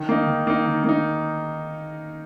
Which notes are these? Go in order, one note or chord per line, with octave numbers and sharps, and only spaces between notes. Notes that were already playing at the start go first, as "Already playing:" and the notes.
Already playing: D#3
A#3 D#4
D#3
A#3 D#4
D#3
A#3 D#4